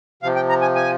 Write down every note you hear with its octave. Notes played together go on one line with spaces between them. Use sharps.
C3 F3 F5
G5
A#5
G#5
G#5